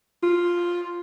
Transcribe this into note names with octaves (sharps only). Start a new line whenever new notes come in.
F4